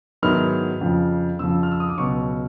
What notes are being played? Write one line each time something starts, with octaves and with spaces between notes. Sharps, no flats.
G#2 D#3 F#3 B3 E4 F6
F2 C#3 F3
F2 C#3 F3 E6
F6
E6
D#6
D6
C#2 B2 F#3 C#6